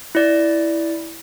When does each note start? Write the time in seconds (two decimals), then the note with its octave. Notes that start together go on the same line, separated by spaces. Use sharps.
0.15 E4 D5